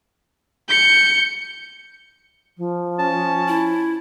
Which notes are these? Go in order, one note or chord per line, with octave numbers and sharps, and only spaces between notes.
G6 C#7
F3
C#4 A5
E4